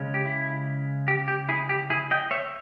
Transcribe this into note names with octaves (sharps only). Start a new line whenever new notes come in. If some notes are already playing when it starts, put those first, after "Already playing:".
Already playing: C#3 G#3 C#4
G4
E4
G4
G4
E4 G#4
G4
E4 G#4
D#5 G5
C#5 E5